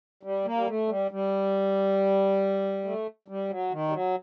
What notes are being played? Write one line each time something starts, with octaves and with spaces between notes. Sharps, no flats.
G3
A#3
G3
A3
G3
G3
A3
G3
F#3
D#3
G3
F#3